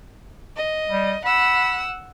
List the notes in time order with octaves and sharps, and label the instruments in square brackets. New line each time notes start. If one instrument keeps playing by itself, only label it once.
[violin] D#5
[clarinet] G3
[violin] F#5 E6 [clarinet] B5